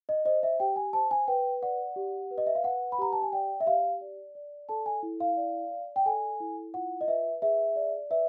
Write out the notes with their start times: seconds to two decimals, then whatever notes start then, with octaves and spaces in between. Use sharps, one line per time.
0.09 D#5
0.25 C5 D#5
0.43 E5
0.60 G4 G5
0.76 G#5
0.93 C5 A5
1.11 G#5
1.28 B4 G5
1.62 D5 F#5
1.96 G4
2.31 B4
2.38 D#5
2.46 E5
2.55 F5
2.64 B4 F#5
2.92 B5
2.98 G4 A#5
3.13 A5
3.22 G#5
3.33 D5 G5
3.60 E5
3.66 G4 F5
4.01 D5
4.35 D5
4.69 A4 A5
4.86 G#5
5.03 E4
5.20 F5
5.37 D5
5.71 D5
5.96 G5
6.06 A4 G#5
6.40 E4
6.74 F4 F#5
7.01 D#5
7.08 B4 E5
7.42 G#4 E5
7.76 D5
8.10 B4 E5